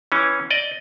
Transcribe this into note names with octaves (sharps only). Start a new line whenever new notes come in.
E3 C#4
D5 D#5